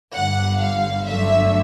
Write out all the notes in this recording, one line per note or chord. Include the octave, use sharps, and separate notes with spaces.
G1 G2 D3 G3 F#5
F5
G1 F#2 D3 F#3 A3 E5